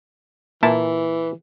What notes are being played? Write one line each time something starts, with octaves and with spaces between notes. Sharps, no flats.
A#2 E3 E4 A5